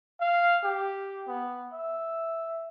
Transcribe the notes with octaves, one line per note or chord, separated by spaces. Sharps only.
F5
G4
B3
E5